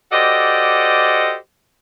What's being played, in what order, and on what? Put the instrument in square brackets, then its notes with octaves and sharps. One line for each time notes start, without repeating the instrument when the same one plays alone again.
[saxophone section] F#4 G4 A4 C5 D5 D#5